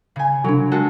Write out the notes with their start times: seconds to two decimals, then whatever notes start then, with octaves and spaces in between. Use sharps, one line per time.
0.16 C#3 G#5
0.44 C3 F#3 D4
0.72 G#3 F#4 A4